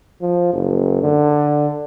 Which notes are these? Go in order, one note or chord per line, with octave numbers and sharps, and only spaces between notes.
F3
F#1
D3